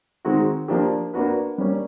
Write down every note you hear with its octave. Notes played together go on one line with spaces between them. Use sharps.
D#3 G#3 C4 D#4 F#4
F3 A#3 D4 G4
A#3 D4 F#4 B4
G3 A#3 C#4